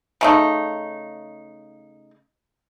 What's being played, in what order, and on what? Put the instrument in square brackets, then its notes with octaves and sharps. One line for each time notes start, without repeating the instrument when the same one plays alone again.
[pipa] C#3 A3 D#4